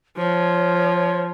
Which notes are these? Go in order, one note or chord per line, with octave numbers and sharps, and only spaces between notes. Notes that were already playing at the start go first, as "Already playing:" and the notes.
F3 C#5